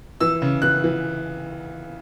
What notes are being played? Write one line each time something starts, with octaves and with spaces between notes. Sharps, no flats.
E3 E6
C#3
E3 F#6
E3